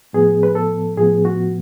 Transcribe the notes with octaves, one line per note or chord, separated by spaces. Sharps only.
A2 F3 B3 G#4
B4
A4
A2 F3 B3 G#4
F#4